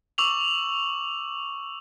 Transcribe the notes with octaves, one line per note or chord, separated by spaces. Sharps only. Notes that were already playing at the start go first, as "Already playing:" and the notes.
C#6 D6 E6 F7 F#7